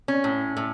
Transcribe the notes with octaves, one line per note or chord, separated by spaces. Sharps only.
C#4
A2
A2